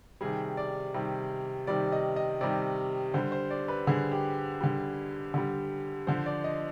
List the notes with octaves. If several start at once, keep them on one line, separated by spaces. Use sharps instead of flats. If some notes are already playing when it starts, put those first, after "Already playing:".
C3 D#3 G3 G#4
D5
C3 D#3 G3
C3 D#3 G3 D5
D#5
D#5
C3 D#3 G3 D5
D3 G3 C5
C5
D5
B4
D3 G3 G#4
G4
D3 G3
D3 G3
D3 F3 C5
D5
D#5